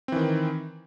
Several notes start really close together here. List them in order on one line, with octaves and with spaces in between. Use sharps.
C4 E3 D#3